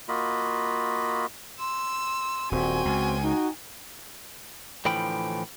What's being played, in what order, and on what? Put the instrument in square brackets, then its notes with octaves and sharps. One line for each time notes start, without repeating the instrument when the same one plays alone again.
[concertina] A#3 F4 F#4 D#5 B5
[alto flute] C6 [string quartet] E6
[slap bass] D#1 [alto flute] C4 [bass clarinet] F#4 [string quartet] G5 G#5
[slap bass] C#2
[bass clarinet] D#4 [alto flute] F#4
[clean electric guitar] A2 D3 E3 F3 G5 B5